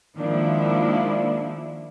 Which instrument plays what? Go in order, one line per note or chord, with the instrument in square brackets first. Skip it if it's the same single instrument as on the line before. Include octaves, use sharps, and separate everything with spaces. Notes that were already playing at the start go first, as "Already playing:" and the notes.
[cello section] D#3 F3 G#3 A#3 D4 E4